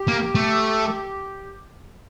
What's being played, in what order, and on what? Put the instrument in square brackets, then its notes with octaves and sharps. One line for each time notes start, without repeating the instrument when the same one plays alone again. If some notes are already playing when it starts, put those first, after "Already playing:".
Already playing: [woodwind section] G4
[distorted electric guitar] A#3
A3